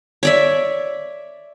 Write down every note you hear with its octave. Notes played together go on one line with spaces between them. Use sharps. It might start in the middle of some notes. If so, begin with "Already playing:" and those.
C#5 D5 E5